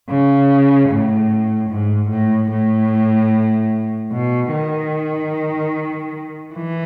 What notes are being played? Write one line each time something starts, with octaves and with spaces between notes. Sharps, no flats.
C#3
A2
G#2
A2
A2
B2
D#3
E3